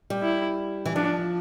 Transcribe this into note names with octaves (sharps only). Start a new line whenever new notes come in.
G3
E4
E3
F3 D4